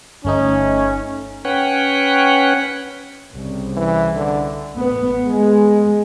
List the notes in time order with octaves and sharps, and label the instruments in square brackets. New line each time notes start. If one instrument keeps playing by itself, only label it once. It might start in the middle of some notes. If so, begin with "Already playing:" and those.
[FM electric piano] G1 A3 D#4 [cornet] C#4
[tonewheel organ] C#4 B4 C#5 F#5 G5
[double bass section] C2 C#3
[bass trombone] E3
D3
[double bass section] B3
G#3